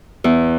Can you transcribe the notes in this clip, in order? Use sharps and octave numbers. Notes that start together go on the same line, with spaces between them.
E2